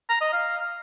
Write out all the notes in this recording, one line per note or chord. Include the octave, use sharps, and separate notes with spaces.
A#5
D#5
F5